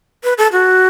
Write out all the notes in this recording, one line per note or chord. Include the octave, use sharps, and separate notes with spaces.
B4
A4
F#4